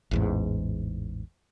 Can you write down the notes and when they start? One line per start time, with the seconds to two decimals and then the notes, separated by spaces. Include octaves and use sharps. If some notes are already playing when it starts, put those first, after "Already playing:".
0.11 A1 E2 G#2